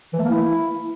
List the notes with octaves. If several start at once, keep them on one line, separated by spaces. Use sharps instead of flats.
E3
A3
A#3
E4